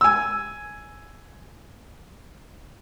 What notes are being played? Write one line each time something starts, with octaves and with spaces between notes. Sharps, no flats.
G#5 E6